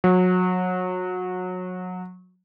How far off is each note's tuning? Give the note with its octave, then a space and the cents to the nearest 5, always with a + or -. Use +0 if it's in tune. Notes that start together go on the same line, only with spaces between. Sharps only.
F#3 -25